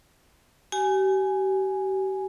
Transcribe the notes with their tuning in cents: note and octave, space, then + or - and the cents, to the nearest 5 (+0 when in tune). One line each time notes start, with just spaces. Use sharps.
G4 -40 G#5 +0